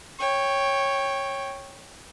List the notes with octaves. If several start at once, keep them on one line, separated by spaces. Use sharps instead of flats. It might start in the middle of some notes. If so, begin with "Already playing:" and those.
C#5 G5